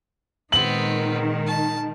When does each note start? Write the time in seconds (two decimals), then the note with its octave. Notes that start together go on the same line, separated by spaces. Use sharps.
0.52 A#2 D#3 G#3 B3 C4 F#7
1.46 A5